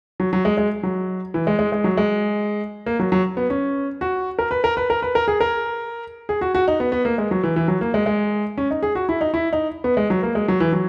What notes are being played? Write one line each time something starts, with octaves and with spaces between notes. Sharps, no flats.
F#3
F#3
G#3
G#3
F#3
E3
G#3
G#3
G#3
F#3
G#3
A#3
F#3
F#3
B3
C#4
F#4
A#4
B4
A#4
B4
A#4
B4
A#4
G#4
A#4
G#4
F#4
F#4
D#4
B3
B3
A#3
G#3
F#3
E3
E3
F#3
A#3
G#3
G#3
C#4
D#4
G#4
F#4
E4
D#4
E4
D#4
B3
G#3
F#3
A#3
G#3
F#3
E3
F#3